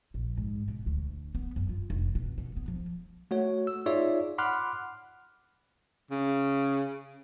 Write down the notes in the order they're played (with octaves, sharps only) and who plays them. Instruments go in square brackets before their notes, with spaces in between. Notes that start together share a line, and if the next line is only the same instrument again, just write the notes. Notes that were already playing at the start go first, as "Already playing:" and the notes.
[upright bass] A#1
G#2
B2
D2
B3
F#2
F4
F1
B2
B2
B3
F3
[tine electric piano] A3 F#4 C#5
E6
D#4 F4 G#4 C#5 D5 E5
F#5 B5 C6 D6 F6 F#6
[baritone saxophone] C#3